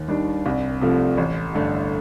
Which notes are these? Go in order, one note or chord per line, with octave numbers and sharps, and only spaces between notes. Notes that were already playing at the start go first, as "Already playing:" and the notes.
Already playing: D#2
D#3 G3 D4
C2
C3 F3 A3
A1
G2 D3 A3